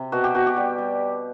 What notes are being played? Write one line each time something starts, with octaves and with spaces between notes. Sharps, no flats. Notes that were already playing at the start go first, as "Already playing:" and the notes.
Already playing: C3
B2 F#4
G4
B2 F#4
G4
G3
G3